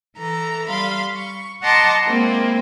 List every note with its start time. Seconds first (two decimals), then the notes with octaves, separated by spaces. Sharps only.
0.17 E3 A4 A#5
0.68 G3 F5 B5 C6
1.14 C#6
1.61 D#5 F#5 A5 A#5 C6 D6
2.05 G#3 A#3 C4 E4